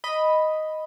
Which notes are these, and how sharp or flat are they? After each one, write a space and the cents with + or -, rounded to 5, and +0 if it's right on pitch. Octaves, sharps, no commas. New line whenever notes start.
D#5 +0 B5 +0